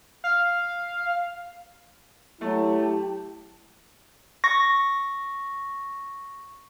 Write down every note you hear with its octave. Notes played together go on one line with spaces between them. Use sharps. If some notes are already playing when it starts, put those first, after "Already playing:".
F5
F#3 A3 E4 G4 A5
C#6 A#6